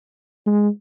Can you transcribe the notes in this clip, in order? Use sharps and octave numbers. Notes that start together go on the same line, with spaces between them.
G#3